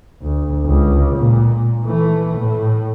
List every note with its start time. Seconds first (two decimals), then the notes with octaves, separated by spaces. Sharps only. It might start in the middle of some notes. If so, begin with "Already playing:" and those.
0.22 D2
0.66 C#2
1.17 A#2
1.85 E3 A3
2.39 A2